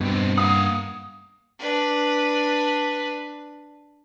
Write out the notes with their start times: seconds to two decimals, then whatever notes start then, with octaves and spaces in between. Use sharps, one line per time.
0.01 G2 B2 C4
0.38 A#3 F5 F#5 D#6
1.59 D4 B4